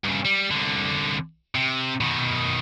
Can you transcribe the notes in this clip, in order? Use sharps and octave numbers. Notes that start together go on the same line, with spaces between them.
G2 C#3
G3
C2 D3
C3
B2 D#3